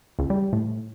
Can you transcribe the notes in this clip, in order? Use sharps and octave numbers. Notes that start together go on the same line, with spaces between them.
C#2
G3
A2